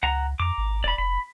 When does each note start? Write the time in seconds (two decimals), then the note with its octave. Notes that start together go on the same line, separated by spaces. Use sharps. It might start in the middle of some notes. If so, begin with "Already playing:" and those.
0.03 C#2 F#5 A#5
0.40 F2 A#5 D6
0.58 G#1
0.84 E1 D5 B5
0.98 F1 B5